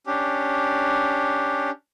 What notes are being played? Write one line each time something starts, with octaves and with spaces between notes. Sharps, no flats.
C#4 D4 G4